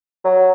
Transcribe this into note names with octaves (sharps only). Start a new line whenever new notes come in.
F#3